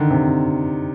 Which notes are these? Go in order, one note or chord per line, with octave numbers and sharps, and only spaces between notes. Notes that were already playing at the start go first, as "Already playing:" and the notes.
Already playing: D3 D#3
C3